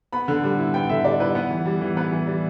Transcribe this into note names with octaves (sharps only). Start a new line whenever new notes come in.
B3 B5
D3
G3
E4
B3 G5
D3 E5
G3 D5
E4 B4
B3
E3
G3
E3
B3 B4
E3
G3